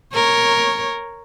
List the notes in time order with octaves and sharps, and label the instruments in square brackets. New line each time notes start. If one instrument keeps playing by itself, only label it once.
[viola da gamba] A#4 C#5